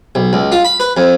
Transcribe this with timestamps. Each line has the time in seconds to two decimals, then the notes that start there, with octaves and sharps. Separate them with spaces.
0.15 B1
0.33 C#2
0.52 F4
0.65 B5
0.80 B4
0.97 F2